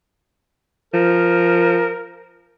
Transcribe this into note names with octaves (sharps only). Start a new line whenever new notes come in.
F3 A#4